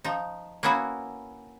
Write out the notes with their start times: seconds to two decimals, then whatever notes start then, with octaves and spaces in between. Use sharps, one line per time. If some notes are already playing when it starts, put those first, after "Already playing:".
0.04 F3 D#4
0.63 A#3 B3 C#4 E4 F#4